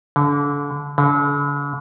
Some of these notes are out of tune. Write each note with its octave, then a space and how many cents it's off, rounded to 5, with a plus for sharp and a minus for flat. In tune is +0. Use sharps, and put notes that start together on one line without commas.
D3 -30
D3 -45